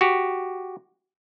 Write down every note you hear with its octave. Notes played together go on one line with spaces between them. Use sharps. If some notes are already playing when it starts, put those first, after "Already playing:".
F#4 G4